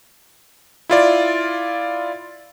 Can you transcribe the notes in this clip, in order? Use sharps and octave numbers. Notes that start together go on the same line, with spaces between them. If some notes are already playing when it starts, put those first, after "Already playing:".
E4 F4 D5